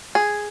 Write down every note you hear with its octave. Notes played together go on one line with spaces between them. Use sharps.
G#4